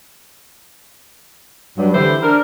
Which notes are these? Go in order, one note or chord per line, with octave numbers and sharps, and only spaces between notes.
G2 F#3
D3 E3 A3 E4 G4 C5
D4 A#4